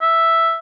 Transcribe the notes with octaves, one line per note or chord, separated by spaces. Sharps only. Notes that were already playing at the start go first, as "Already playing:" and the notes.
E5